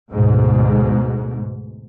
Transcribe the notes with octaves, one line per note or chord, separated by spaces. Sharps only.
D2 G#2 B2